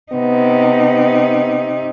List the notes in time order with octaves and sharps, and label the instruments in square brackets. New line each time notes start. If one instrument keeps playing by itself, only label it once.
[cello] C3 D#4 [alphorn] B3